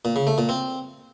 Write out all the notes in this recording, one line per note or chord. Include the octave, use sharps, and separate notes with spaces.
A#2
C#3
A3
A#2
C4